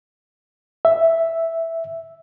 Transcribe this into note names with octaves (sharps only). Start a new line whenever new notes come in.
E5